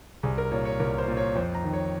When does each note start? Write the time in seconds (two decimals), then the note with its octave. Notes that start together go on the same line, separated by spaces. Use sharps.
0.23 C2 G#4
0.38 A#4
0.52 A#2 C#5
0.65 C#5
0.80 C2 A#4
0.98 C5
1.08 A#2
1.17 C#5
1.35 F2 C5
1.55 A#5
1.64 D#3
1.74 C#5